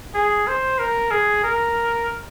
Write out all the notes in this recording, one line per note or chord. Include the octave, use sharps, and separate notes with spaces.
G#4
C5
A#4
G#4
A#4